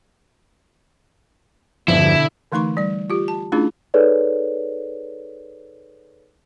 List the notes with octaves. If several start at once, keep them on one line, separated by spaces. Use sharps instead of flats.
E1 G2 B2 D3 F3 E4
D3 E3 A3 D#4 C6 C#6
G3 D5
F4 G4
A5
A3 C#4 D4 E4 F4 G#4
D#4 G#4 A4 B4 C#5 D5